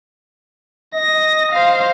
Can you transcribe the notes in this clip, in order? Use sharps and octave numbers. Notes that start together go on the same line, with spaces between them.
D#5 A#6
C5 F5